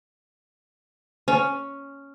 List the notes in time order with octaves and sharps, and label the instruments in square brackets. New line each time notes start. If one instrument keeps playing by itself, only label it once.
[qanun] C#4